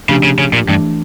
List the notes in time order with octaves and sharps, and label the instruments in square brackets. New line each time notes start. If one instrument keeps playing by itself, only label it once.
[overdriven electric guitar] C#3 [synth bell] F3 A3 D4 G4
[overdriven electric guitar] C#3
C#3
A#2
[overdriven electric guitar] G2 [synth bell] E3 A3 D4